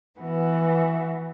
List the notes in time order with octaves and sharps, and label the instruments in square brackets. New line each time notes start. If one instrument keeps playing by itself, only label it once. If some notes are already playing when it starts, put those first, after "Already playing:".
[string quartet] E3 B3 F#4